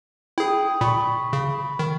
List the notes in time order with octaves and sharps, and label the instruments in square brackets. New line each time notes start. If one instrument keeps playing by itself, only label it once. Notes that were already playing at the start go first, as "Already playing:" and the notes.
[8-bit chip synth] E4 G#4 [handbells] G5 D#6
[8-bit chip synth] A#2 [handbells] B5 C#6
[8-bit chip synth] C#3
D#3